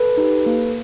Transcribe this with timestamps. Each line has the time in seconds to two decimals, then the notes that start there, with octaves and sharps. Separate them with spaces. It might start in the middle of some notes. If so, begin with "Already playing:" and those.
Already playing: A4 B4
0.17 D#4 G4
0.46 A#3